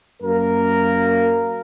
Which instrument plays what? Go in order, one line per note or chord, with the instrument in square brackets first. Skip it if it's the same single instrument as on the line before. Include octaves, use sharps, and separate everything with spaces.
[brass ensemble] F#2 A#3 A#4